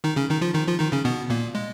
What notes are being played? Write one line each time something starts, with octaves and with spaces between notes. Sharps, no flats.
D#3 D#4
C#3 C#4
D#3 D#4
F3 F4
D#3 D#4
F3 F4
D#3 D#4
C#3 C#4
B2 B3
A#2 A#3
G#3